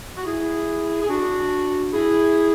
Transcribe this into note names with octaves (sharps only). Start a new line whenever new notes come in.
F#4
E4 G#4
G#4
D4 F#4
E4 G#4